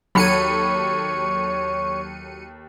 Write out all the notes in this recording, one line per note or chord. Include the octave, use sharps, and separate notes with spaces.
D#2 F#3 A4 C#5 B5 C#7 D#7